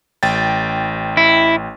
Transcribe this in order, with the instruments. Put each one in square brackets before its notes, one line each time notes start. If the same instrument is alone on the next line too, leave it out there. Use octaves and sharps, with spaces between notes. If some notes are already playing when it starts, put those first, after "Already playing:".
[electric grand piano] A1 G5 A6
[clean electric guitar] E4